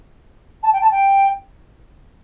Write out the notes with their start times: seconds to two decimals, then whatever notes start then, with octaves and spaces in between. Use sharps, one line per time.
0.63 A5
0.73 G5
0.82 A5
0.91 G5